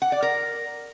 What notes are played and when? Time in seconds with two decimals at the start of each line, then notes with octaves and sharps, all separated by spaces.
0.02 F#5
0.12 D5
0.22 A#4